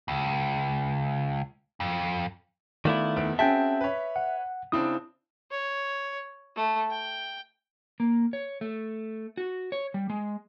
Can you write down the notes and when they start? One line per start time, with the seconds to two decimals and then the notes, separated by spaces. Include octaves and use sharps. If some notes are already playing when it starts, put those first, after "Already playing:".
0.08 C#2
1.80 F2
2.85 D#3 A3 B3 E4 F4 D5
3.16 F1 B3 D7
3.39 C4 C#4 F#4 G#4 E5 G5 A5
3.81 B4 C#5
4.16 F#5
4.72 C#3 C4 D4 E4 D#6
5.51 C#5
6.56 A3
6.90 G5
8.00 A#3
8.33 C#5
8.61 A3
9.37 F#4
9.72 C#5
9.94 G3
10.10 G#3